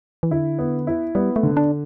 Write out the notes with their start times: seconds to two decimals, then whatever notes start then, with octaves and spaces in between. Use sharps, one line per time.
0.23 E3
0.31 D3 E4
0.59 B3
0.87 E4
1.15 G3 B3
1.36 A3
1.43 D3
1.57 D4